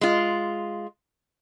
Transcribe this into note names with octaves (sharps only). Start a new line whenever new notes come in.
G#3 F4